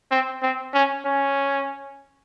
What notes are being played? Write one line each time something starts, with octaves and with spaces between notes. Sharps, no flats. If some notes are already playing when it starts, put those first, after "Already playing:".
C4
C4
C#4
C#4